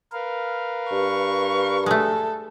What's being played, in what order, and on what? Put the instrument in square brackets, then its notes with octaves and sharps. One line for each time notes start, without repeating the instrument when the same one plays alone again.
[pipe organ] A#4 B4 F5
[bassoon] G2 [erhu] C#6
[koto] G#3 A3 [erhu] A4